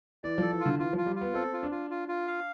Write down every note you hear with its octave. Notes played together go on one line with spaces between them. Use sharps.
E3 D5
F3 A4
E3
F4
D3
E3 F4
F3 F4
G3
F4
B3
C4 A4
F4
D4
F4
F4
F4
F5